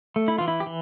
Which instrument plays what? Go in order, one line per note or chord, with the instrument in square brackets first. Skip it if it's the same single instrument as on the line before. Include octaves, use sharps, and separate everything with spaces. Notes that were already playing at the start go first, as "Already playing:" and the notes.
[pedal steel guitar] A3
E4
E3 F4
E4
G4
E3